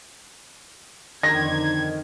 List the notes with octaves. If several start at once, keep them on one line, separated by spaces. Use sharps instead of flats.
F2 D3 D#3 G#6 A#6